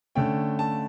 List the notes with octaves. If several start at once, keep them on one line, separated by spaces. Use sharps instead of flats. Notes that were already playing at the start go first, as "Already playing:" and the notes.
D3 A3 C#4 G5
A5